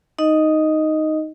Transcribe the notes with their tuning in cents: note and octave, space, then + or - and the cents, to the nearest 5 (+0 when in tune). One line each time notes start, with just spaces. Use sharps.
D#4 +0 D#5 +0